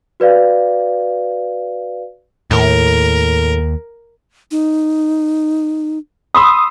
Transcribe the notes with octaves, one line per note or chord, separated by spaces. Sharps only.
F#4 B4 D5 F5
D#2 A2 A#4
D#4
B5 C6 D#6 E6